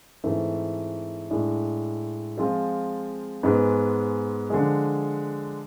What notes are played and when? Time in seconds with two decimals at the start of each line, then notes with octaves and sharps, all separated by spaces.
0.24 G#2 E3 A3 C4
1.30 A2 G#3 D4
2.37 F3 G#3 C4 F4
3.43 G#2 G#3 B3
4.50 D3 F3 G#3